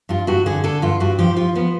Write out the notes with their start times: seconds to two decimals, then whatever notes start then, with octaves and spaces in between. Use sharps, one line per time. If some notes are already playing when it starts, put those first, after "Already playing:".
0.09 G2 F4
0.27 G2 F#4
0.46 D3 G#4
0.64 D3 A4
0.82 G2 F4
1.00 G2 F#4
1.19 F3 G4
1.36 F3 F4
1.55 F3 B3